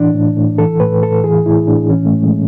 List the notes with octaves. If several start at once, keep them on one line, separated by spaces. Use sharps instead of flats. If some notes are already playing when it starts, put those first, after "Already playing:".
Already playing: A2 E3 D4
A2
A2
E3 A4
A2 B4
A2 A4
E3 G#4
A2 E4
A2 D4
E3 C#4
A3
A2
G#3